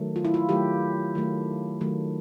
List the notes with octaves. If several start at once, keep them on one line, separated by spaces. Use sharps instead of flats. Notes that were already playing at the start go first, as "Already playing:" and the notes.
Already playing: D#3 F#3 A3
F4
E4
F4
D#3 F#3 A3 G4
D#3 F#3 A3
D#3 F#3 A3